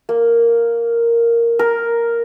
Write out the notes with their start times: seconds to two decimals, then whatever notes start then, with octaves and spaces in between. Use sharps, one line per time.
0.09 A#3
1.59 A#4